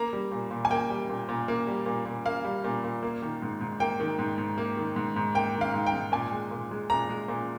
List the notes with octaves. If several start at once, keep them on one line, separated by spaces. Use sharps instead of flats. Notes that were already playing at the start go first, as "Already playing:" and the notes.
Already playing: A#3 A#5
G3
A#2
A#2
G#5
A#3 G5
G3
A#2
A#2
A#3
G3
A#2
A#2
A#3 F5
G3
A#2
A#2
A#3
D#3
G#2
G#2
A#3 G5
D#3
G#2
G#2
A#3
D#3
G#2
G#2
A#3 G5
D#3
F5
G#2
G5
G#2
A#2 G#5
G#3
A#2
G#3
A#2 A#5
G#3
A#2